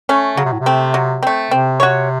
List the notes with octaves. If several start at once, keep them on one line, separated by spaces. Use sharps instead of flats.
A3 C#4
C#3 F#3
C3
A2
C3
A3 C4
F#3
A3 C4
C3 C4
F#4 C#5